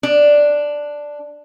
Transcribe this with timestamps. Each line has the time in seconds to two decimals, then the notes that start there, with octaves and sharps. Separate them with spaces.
0.03 D4